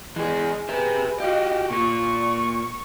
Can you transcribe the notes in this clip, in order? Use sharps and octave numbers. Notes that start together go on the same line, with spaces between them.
E3 G#3 G#4
G4 G#4 B4 E5
F#4 G4 D#5 F5
A#2 F4 C#6